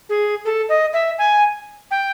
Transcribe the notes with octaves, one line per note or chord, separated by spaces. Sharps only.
G#4
A4
D#5
E5
G#5
G5